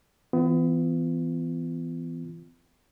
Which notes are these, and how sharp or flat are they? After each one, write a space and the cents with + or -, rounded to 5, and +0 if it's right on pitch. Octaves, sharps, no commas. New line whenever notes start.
E3 +0 B3 +35 F4 -25